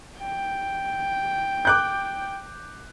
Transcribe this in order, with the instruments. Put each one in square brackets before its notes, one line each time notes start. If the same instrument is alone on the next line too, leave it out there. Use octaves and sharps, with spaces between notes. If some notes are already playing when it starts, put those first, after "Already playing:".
[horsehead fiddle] G5
[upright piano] D6 F#6 G6